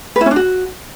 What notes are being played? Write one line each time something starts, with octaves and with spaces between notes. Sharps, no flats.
B4
E4
C#4
D4
F#4